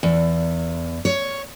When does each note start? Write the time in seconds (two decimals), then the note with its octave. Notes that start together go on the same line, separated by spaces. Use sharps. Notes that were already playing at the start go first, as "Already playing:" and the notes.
0.03 E2
1.05 C#5